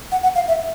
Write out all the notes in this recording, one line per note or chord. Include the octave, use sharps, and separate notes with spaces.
F#5
F#5
F5
E5